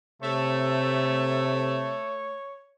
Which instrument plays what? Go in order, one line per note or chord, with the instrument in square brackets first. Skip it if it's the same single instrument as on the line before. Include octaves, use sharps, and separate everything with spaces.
[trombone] C3 [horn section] A3 [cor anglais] C#5